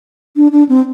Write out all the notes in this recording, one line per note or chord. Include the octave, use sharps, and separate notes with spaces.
D4
D4
C4